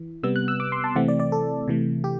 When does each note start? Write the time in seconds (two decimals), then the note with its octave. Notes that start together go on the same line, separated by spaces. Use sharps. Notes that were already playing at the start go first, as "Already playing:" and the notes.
Already playing: E3
0.23 C3 G3 B3 E6
0.36 F#6
0.48 E6
0.60 D6
0.72 C6
0.84 A5
0.95 C3 E3 A3 C4 F#5
1.08 D5
1.20 D5
1.32 A4
1.68 C3 E3 A3
2.04 G4